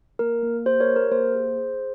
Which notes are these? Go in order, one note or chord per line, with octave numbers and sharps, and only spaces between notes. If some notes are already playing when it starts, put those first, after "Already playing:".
A#3 A#4
A#3
G4 C5
A#4 C#5
G4
A#4
A#3 C5
G#4
G#4